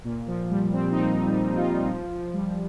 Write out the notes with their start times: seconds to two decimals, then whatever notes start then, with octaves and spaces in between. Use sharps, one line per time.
0.04 A#2
0.27 F3
0.50 G3
0.73 C4
0.92 D#4
0.96 C4
1.26 G3
1.57 F4
1.88 F3
2.11 F3
2.33 G3